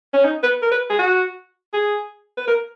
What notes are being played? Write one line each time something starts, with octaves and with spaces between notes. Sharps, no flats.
C#4
D#4
B4
A#4
B4
G#4
F#4
G#4
B4
A#4